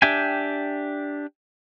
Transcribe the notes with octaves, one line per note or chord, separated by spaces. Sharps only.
D4 G4 E5 G5 G#5